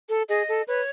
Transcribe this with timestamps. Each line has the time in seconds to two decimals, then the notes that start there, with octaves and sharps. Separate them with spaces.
0.09 A4
0.29 G#4 D#5
0.48 A4
0.68 B4 C#5